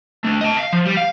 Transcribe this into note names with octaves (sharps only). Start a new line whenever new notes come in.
D3 A3
D#5 A5
F5
F3
G3
F5